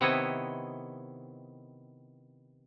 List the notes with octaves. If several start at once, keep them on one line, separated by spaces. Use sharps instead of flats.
C3 D#3 B3 E4 C#5 D#5